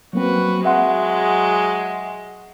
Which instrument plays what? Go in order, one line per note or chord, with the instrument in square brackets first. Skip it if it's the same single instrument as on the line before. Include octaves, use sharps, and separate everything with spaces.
[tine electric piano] F#3 A#3 C4 [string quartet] F#4 B4
[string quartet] F#3 G#3 [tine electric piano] E5 F#5 C6